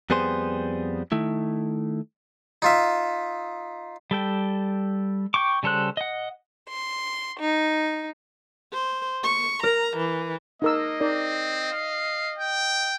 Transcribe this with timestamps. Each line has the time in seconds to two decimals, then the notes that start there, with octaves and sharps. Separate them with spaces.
0.10 F2 G3 B3 G#4 C5 C6
1.12 D#3 A3 E4
2.62 D#4 F4 E5
4.11 G3 A4 G5
5.34 G5 C#6 D6
5.63 C#3 G3 A4 C5 F#6
5.97 D#5 F#5
6.69 C6
7.40 D#4
8.73 C5
9.23 C#6
9.63 A#4 A#5
9.97 E3
10.62 A#3 D#4 A#4 D#5 E6
11.01 C4 D#4 A#4 D5
11.72 F5
12.38 G5